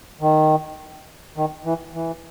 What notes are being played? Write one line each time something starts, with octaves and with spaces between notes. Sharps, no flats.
D#3
D#3
E3
E3